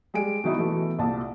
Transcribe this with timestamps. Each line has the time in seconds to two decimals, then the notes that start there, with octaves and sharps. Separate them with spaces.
0.14 G3 G#3 G#5 D7
0.44 B2 D#3 D#4 E4
0.58 B2 E3 A3
0.99 C2 A#2 A5